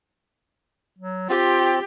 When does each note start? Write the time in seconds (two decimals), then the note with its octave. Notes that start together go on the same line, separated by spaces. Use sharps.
0.99 F#3
1.29 C4 F4 G4